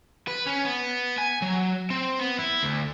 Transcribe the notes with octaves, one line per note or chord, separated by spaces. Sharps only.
B4
C#4
B3
G#5
F#3
C4
B3
E4
D2